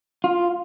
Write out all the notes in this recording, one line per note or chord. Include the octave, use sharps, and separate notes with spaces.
F4